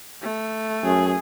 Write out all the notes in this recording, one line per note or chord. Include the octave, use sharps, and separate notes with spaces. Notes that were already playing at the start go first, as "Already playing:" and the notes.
A3
F#2 G#4